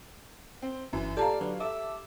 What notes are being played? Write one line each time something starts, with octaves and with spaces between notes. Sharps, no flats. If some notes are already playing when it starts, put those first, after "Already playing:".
C4 C5
G1 F#2 E3
A#2 G4 A4 D5 F5 A5 A#5
D3 F#3 B4
A4 E5 D6